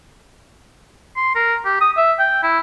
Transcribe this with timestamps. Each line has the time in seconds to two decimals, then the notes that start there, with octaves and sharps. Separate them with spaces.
1.17 C6
1.35 A#4
1.65 G4
1.81 D#6
1.97 E5
2.19 G5
2.43 E4